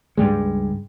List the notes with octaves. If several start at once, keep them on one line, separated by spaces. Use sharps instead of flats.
C#2 G2 G3 G#3